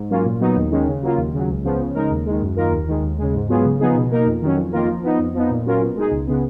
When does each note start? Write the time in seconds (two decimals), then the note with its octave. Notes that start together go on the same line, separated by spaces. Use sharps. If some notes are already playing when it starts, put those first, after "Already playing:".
Already playing: G#2
0.10 F#3 A#3 C#4 F4
0.25 A#2
0.40 F#3 B3 D#4
0.56 D#2
0.71 D#3 G#3 C#4
0.86 C#3
1.02 F#3 A#3 F4
1.17 D#2
1.33 C#3 F#3
1.48 C#2
1.64 C#3 F3 B3
1.79 C#3
1.95 G#3 D#4 A#4
2.11 D#2
2.26 D#3 G#3
2.41 F#2
2.56 D#3 A#3 F4 A#4
2.72 D#2
2.88 D#3 G#3
3.03 D#2
3.18 C#3 G#3
3.34 G#2
3.49 F#3 B3 F4 G#4
3.64 C#3
3.80 F3 B3 D#4 G#4
3.95 B2
4.11 A#3 D#4 A#4
4.26 F2
4.42 D#3 F#3 C#4
4.57 F2
4.72 D#3 A#3 F4 A#4
4.88 F3
5.03 B3 D#4
5.19 F2
5.34 F3 B3 D#4
5.50 A#2
5.65 F#3 C#4 F4 A#4
5.81 B2
5.96 G#3 D#4 G#4
6.11 C#2
6.27 C#3 G#3 B3